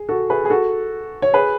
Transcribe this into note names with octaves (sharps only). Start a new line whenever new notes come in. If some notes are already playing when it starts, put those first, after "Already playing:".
Already playing: G#4
F#4 A4
G#4 B4
G#4
F#4 A4
C#5
G#4 B4